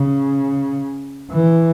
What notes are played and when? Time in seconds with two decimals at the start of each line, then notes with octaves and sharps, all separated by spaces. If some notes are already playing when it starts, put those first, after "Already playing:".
Already playing: C#3
1.31 E3